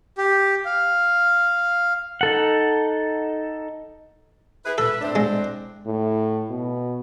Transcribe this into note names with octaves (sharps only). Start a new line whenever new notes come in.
G4
F5
D#4 A4 F#5
E4 G#4 B4
A4 B4 E5
A2 C4 D4
G#3
A2
B2